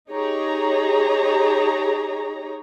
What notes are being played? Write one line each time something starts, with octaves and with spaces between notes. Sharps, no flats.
D#4 G4 G#4 C#5 A#5